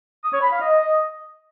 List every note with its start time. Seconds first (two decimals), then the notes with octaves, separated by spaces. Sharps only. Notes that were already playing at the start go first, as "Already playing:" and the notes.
0.23 D#6
0.33 C#5
0.42 B5
0.51 F5
0.61 D#5